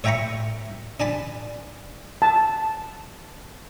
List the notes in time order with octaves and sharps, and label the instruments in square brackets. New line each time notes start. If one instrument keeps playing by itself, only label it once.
[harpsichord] C#5 E5 G5 A#5 B5 C#6
D4 G#5 A5 B5
[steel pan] A5